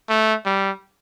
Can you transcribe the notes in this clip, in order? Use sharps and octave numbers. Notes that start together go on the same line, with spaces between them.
A3
G3